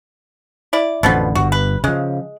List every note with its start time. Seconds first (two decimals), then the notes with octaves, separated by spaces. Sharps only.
0.73 E4 D5
1.03 A1 F2 B2 D3 F3 B3
1.35 G1 G2 F#4
1.52 B4
1.84 C#3 F3 G#3